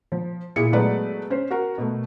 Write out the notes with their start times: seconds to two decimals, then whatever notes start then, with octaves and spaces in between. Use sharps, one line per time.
0.12 F3
0.56 A#2 E4 G#4 C#7
0.73 F#3 G#3 A3 B3 B4 D5
1.30 C#4 C5
1.51 F#4 A#4
1.78 B2 A3